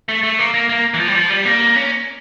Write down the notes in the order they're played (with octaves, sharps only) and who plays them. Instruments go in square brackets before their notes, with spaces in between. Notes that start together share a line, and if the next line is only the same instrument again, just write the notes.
[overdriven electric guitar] A3
A3
A#3
A#3
A#3
E3
F3
G3
F3
G3
A#3
C#4